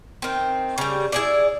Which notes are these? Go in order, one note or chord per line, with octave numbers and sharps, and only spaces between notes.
D#3 C4
C#3 G3
E4 G#4 D5